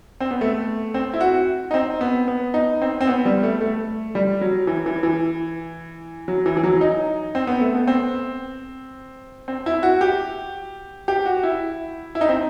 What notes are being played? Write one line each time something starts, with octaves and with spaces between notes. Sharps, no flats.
C4
B3
A3
C4
E4
F#4
D#4
C4
B3
B3
D#4
C4
C4
B3
G3
A3
A3
G3
F#3
E3
E3
E3
F#3
E3
E3
F#3
D#4
C4
B3
A3
B3
C4
C4
E4
F#4
G4
G4
F#4
E4
E4
D#4
C4